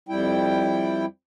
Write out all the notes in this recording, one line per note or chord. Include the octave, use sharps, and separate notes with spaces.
F2 G3 E4 G5